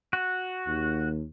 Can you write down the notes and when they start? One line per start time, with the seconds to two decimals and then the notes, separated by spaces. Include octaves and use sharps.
0.13 F#4
0.67 D#2